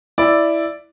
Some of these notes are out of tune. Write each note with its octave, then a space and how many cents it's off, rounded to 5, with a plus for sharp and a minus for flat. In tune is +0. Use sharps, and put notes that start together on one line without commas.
E4 +0 D5 +0